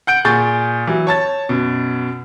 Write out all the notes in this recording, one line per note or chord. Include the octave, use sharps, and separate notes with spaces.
F#5 G6 D7
A#2 G#4 C#6 G6 A6
E3 F#3
C#5 A5 A6
F#2 B2